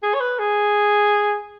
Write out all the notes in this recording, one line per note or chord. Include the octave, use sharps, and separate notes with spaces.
G#4
C#5
B4
G#4